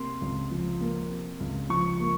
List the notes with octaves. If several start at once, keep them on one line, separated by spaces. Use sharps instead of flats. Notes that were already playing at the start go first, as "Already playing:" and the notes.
Already playing: C3 A#3 C6
C#2
F3
A#3
C3
C#2
F3 C#6
A#3